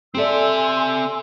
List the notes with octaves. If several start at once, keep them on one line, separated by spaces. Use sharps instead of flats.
C4 G4 A4 D5 E5 G#5 C6 E6